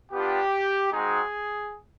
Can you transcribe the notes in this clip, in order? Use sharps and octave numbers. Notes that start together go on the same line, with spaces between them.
B3 D4 F4 G4
G#3 C4 D#4 F#4 G#4